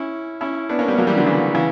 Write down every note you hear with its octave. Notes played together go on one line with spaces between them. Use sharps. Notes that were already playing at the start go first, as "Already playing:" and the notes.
Already playing: C#4 E4
C#4 E4
B3 D4
A#3 C#4
G3 B3
F#3 A#3
E3 G3
D3 F#3
C#3 E3
C#3 E3